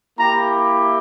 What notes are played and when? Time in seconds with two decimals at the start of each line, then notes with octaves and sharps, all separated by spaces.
0.19 A#3 E4 G4 A#5